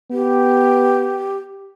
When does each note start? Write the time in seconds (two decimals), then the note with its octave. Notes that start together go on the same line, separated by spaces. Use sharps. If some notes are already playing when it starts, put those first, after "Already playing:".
0.12 B3 G4